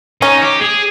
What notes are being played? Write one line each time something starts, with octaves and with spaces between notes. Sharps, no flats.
C#4 D#4
G4
G#4